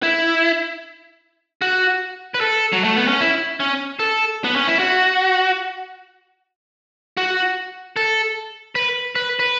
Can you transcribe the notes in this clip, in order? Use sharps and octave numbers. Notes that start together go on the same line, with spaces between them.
E4
F#4
B4
A4
F#3
A3
B3
C#4
E4
C#4
A4
B3
C#4
E4
F#4
F#4
A4
B4
B4
B4